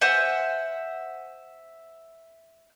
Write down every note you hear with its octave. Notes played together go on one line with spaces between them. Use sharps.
C5 E5 F#5 G#5